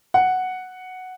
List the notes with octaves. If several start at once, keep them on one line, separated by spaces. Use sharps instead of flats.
F#5